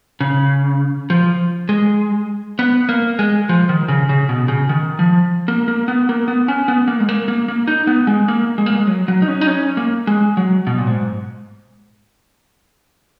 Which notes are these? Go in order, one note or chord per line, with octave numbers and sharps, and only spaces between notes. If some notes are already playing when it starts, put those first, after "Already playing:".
C#3
F3
G#3
B3
A#3
G#3
F3
D#3
C#3
C#3
B2
C#3
D#3
F3
A#3
A#3
B3
A#3
B3
C#4
B3
A#3
G#3
A#3
A#3
A#3
D#4
B3
G#3
A#3
G#3
A#3
G#3
F#3
F#3
D#4
C#4
D#4
C#4
A#3
G#3
F#3
B2
A#2
G#2